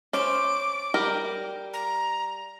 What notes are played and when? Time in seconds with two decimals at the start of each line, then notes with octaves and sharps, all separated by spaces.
0.13 C#4 C5 D6
0.94 G3 G4 A#4
1.73 A#5